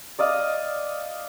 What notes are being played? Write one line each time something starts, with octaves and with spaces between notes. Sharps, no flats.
D5 D#5 F5